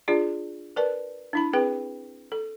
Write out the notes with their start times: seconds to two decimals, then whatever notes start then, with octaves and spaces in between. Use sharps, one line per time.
0.08 D4 F4 G#4 D5
0.76 A#4 B4 D5 A5
1.33 D4 E4 B5
1.53 C4 G#4 B4 G5
2.32 A4